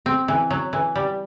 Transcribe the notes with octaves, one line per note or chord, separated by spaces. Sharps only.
C4
E3
F#3
E3
G3